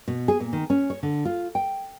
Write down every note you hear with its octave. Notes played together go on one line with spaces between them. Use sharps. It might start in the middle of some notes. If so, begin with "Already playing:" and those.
B2
G#4
A#2
D#3
C#4
C#5
D3
F4
G5